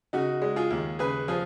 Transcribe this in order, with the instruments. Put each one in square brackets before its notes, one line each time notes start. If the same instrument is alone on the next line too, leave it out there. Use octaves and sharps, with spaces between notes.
[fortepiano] C#3 D#4 F#4
G#3
F4 G#4
D#2
C#3 G#4 B4
F3 F4 G#4